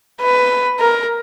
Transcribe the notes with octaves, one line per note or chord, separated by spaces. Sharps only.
B4
A#4